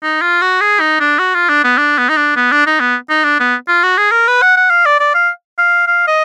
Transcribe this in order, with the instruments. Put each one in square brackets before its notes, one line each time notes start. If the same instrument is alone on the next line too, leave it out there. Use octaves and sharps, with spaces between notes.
[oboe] D#4
F4
F#4
G#4
D#4
D4
F#4
F4
D4
B3
D4
B3
D#4
D4
B3
D4
D#4
B3
D#4
D4
B3
F4
F#4
G#4
A#4
B4
F#5
F#5
F5
D5
D5
F5
F5
F5
D#5